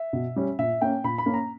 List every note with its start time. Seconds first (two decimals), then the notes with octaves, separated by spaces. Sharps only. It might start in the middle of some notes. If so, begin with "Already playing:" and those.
Already playing: E5
0.13 B2
0.36 G3 C#4
0.59 A#2 E5
0.81 A#3 C#4 G5
1.04 A#2 B5
1.18 B5
1.26 A#3 C#4
1.34 A#5